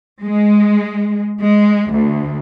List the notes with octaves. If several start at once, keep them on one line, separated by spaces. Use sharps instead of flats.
G#3
G#3
D2